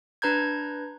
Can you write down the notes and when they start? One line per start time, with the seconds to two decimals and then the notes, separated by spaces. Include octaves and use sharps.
0.22 D4 B4 A#5 G6 G#6